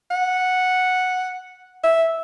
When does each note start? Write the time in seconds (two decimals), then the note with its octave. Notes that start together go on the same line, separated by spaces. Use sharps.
0.11 F#5
1.84 E5